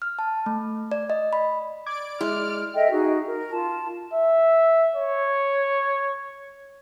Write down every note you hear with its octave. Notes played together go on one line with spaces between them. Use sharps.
F6
A5
A3
D5
D#5
B5
D5 D6 G#6 D7
G#3 E4 F6
A4 D#5 E5 G5
D#4 F#4 G#4
A#4
F4 A5
E5
C#5